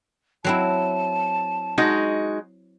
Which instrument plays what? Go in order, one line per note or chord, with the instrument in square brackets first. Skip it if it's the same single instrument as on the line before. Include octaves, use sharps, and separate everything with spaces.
[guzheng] F#3 C4 E4 [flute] A5
[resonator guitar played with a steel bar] G#3 D#4 F#4